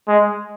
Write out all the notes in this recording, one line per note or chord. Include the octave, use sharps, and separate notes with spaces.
G#3